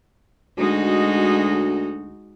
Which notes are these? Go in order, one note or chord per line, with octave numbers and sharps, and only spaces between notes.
D2 G#3 D#4 F#4